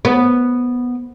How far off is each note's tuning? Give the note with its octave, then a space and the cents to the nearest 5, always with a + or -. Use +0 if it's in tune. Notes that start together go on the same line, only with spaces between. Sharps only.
B3 -5